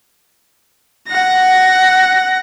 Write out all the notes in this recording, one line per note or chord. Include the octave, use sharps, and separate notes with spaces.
F#5 A#6